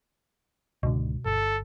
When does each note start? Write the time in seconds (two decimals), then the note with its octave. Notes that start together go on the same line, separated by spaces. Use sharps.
0.83 C#2 G#2 B2 D3
1.26 G1 A4